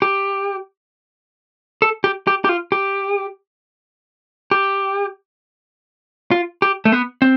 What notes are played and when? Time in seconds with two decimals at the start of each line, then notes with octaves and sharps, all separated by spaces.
0.02 G4
1.82 A4
2.04 G4
2.27 G4
2.44 G4
2.49 F4
2.72 G4
4.51 G4
6.31 F4
6.62 G4
6.85 A3
6.92 B3
7.22 C4